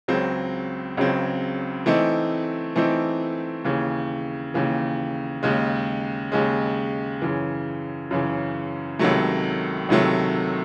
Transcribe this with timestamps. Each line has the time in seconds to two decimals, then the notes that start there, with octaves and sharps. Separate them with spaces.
0.08 C#2 C#3 F#3 C4
0.97 C#2 C#3 F#3 C4
1.86 E3 A3 C4 D#4
2.76 E3 A3 C4 D#4
3.64 D#2 C#3 E3
4.54 D#2 C#3 E3
5.43 D#2 C#3 G#3
6.32 D#2 C#3 G#3
7.22 F#2 C#3 E3
8.11 F#2 C#3 E3
8.99 C#2 C3 D#3 F#3 A3
9.89 C#2 C3 D#3 F#3 A3